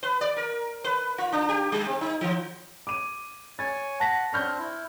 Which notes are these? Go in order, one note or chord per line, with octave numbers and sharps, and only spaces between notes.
B4
D5
A#4
B4
F4
D4
G4
G3
C4
D#4
E3
D6 D#7
C#5 G#5 A6
F#5 A5 A#6 B6
C4 D4 C5 C#6 F6 G6
E4